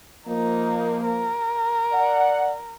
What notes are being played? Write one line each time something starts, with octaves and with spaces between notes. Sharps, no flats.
F3 A#3 D#4
A#4
D5 F#5